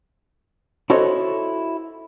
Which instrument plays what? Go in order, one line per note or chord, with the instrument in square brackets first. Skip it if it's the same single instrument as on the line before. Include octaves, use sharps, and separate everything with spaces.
[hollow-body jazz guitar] E4 F#4 A4 C5 C#5 D#5